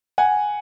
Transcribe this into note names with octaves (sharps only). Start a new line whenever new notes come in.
F#5 G#5